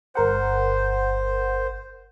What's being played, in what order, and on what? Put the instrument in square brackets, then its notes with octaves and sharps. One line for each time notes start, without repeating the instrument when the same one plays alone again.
[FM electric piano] G1 A#4 F#5 [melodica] C5